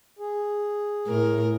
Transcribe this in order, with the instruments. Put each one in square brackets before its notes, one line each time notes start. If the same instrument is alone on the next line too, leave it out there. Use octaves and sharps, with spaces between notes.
[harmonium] G#4
[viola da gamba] A2 A#4